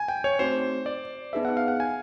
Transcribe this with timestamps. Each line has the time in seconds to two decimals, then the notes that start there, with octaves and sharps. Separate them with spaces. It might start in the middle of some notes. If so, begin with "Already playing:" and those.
Already playing: G#5
0.08 G5
0.24 C#5
0.39 A3 C4 D#4 F#4 C5
0.86 D5
1.33 B3 D#4 G#4 B4 E5
1.45 F#5
1.57 F5
1.68 F#5
1.80 G#5